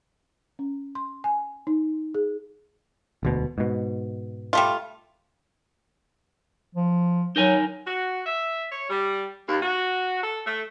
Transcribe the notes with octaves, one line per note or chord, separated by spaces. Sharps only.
C#4
C6
G#5
D#4
G#4
E1 D2 B2
G#2 B2
G3 A3 F4
F3
F#3 D#4 A#4 G#5
F#4
E5
C#5
G3
D#2
F#4
A4
A3